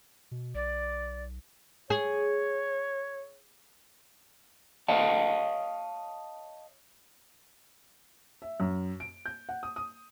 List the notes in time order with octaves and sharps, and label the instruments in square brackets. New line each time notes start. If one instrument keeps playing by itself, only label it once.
[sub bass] B2
[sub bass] B1 [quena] D5
[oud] G#4 [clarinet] C#5
[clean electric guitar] C#5 D#5 F5 A5
[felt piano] E5
F#2
D7
G6
F#5
D#6
D#6